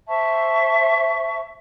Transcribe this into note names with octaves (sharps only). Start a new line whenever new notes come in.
C5 E5 A5 C#6